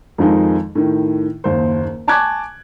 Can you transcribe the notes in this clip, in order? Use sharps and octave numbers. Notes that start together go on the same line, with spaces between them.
F2 D#3 F3 G#3 D#4
A2 D#3
F#1 D#2 C5
G#5 A5 C#6 D6 F#6 G#6